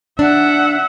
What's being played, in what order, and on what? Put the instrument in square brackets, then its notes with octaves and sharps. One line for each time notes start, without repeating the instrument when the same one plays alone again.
[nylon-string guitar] D4 [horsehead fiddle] E5 F#5